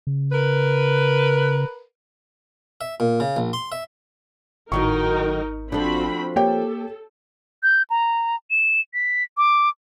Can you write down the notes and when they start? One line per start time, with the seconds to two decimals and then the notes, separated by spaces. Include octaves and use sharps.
0.07 C#3
0.32 A#4 B4
2.81 E5
3.00 A#2
3.20 C#3
3.36 A#1
3.53 C6
3.72 E5
4.72 G#1 A2 D#3 F#3 D#4 A#4 C#6
5.72 F3 A3 C4 D4 F#4 B5
6.36 A#3 G4 A4 C#5 G5
7.63 G6
7.90 A#5
8.51 E7
8.94 B6
9.37 D6